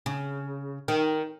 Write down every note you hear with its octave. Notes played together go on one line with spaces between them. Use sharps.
C#3
D#3